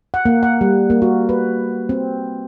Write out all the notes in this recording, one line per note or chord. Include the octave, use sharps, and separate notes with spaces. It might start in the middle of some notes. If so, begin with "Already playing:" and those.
F#5
A#3
F#5
G3
A#3
F#4
B4
C4